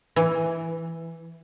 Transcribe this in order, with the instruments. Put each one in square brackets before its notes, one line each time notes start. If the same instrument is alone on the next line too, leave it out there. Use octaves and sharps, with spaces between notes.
[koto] E3